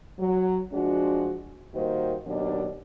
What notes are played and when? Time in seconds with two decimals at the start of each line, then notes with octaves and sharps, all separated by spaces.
0.19 F#3
0.73 F3 G#3 D4 F#4
1.75 D#3 G3 A#3 F#4 C5
2.27 D#2 B2 F#3 D4 D5